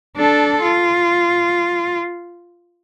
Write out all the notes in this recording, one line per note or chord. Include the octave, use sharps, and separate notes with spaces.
D4 A4
F4